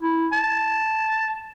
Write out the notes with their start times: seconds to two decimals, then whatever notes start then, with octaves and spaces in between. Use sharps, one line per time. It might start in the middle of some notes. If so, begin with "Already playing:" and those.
0.01 E4
0.32 A5